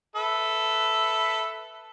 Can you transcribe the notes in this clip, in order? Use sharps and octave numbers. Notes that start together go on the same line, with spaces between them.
A4 B4 E5